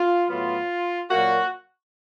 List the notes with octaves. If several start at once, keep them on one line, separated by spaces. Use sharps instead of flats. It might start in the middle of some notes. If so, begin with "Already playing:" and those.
Already playing: F4
A2 F#3 B3 F4
A#2 F#3 A#3 F#4